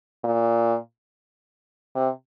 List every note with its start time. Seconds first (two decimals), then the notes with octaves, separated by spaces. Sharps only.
0.24 A#2
1.95 C3